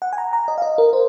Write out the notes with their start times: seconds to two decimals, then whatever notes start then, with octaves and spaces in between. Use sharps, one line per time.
0.02 F#5
0.13 G#5
0.18 A#5
0.33 A#5
0.48 D#5
0.58 F5
0.62 D#5
0.78 A#4
0.93 C5